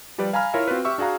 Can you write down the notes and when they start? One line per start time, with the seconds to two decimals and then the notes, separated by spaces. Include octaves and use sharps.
0.18 F3 G3 G4 B4 D5
0.33 F5 G#5 A#5 B5 F6
0.54 E4 F4 A#4 C#5 E5
0.68 C4 F4 F#4 B4
0.85 G4 E5 C#6 E6
0.98 D4 F#4 G#4 F5 A#5